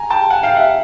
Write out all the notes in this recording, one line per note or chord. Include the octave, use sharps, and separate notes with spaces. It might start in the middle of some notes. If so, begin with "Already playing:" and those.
Already playing: G#5 A#5
G5 A5
F#5 G#5
F5 G5
E5 F#5